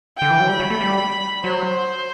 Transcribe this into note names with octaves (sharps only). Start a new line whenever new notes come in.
D3 G5
E3
F#3
G3 B5
F#3
A3
G3
F#3 C5